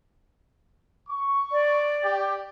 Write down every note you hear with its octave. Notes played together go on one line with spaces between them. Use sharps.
C#6
D5
G4